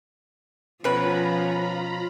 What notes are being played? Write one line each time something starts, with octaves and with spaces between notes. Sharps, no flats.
B2 F3 C#4 F4 B4 A#5 B5